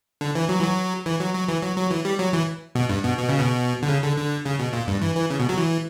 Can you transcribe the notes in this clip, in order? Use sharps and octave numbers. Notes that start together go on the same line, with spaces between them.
D3
E3
F#3
E3
F#3
E3
F#3
F#3
E3
F#3
F#3
E3
G3
F#3
E3
B2
G2
B2
B2
C#3
B2
D3
C#3
D3
D3
C#3
B2
A#2
G2
E3
E3
C#3
B2
F#3
E3